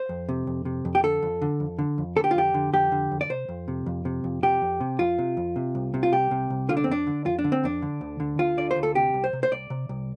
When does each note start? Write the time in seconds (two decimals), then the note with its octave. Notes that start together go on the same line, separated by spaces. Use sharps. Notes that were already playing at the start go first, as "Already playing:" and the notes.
Already playing: C5
0.09 F2
0.29 C3
0.47 F2
0.65 C3
0.85 F2
0.95 G4
1.03 D3 A4
1.23 F2
1.42 D3
1.60 F2
1.79 D3
1.98 F2
2.16 D3 A4
2.24 G4
2.31 F4
2.35 F2 G4
2.54 D3
2.73 F2 G4
2.92 D3
3.12 F2
3.21 D5
3.30 C3 C5
3.49 F2
3.68 C3
3.86 F2
4.05 C3
4.24 F2
4.43 C3 G4
4.62 F2
4.80 C3
4.99 F2 F4
5.18 C3
5.37 F2
5.56 C3
5.75 C2
5.94 C3
6.03 F4
6.12 C2 G4
6.31 C3
6.50 C2
6.69 D3 F4
6.77 D4
6.84 C4
6.88 F2 D4
7.07 D3
7.26 F2 F4
7.39 D4
7.44 D3
7.52 C4
7.64 F2 D4
7.82 D3
8.01 D2
8.20 D3
8.39 D2 F4
8.57 D3 D5
8.71 C5
8.76 D2
8.83 A4
8.95 C3 G4
9.14 C2
9.24 C5
9.33 C3
9.43 C5
9.51 C2 D5
9.70 C3
9.89 C2